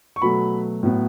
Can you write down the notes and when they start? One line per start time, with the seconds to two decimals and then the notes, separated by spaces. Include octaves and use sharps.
0.16 C#6
0.22 B2 F#3 A3 B5
0.83 A2 F#3 B3